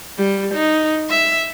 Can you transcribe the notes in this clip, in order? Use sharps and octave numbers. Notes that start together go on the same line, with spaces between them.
G3
D#4
E5